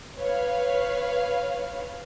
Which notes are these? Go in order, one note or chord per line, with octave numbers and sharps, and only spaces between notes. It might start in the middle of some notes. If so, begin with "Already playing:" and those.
B4 C#5 F5